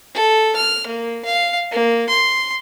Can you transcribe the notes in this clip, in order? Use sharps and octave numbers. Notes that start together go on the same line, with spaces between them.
A4
F6
A#3
F5
A#3
C6